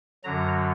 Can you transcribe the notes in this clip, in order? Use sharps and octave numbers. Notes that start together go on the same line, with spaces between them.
F#2 D3 F#3 A#5